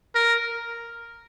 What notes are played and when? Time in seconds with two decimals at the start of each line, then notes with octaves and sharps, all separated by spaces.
0.15 A#4